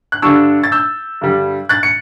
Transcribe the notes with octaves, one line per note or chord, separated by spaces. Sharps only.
F#6
G2 D3 G3 D4 C#6 E6
A6
E6 G6
G2 D3 G3
F#6 A6
C#7